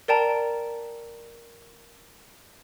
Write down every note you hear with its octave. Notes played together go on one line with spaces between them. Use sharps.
A#4 D5 G5 A5 A#5